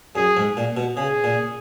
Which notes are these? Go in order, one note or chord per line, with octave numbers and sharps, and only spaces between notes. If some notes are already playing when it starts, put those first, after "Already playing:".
F#2 G#4
G#2
A#2
B2
C#3 G#4
A#2